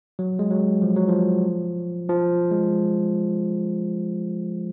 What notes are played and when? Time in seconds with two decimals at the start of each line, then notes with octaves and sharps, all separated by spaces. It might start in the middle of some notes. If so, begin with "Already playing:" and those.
0.19 F#3
0.39 G#3
0.51 F#3
0.82 F3
0.96 F#3
1.08 F3
2.09 F3
2.51 G#3